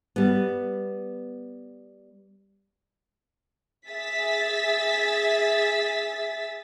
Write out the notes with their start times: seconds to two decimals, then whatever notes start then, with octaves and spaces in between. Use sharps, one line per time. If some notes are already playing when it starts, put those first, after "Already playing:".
0.16 G3 B3
3.88 G#4 E5 A6 B6